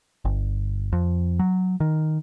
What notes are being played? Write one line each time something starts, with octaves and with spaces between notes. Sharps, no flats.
G1
F2
F#3
D#3